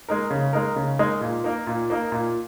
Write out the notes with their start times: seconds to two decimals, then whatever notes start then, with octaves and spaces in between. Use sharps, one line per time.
0.09 G#3 D#4 A#4
0.31 C#3
0.53 G#3 D#4 A#4
0.76 C#3
0.99 G#3 D#4 A#4
1.21 A#2
1.44 A#3 D#4 A#4
1.67 A#2
1.90 A#3 D#4 A#4
2.12 A#2